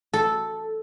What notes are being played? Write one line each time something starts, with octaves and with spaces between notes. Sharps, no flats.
A4